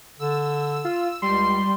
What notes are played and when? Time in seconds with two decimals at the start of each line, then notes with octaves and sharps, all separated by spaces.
0.19 D3 E6
0.85 F4
1.22 C#2 G3 C6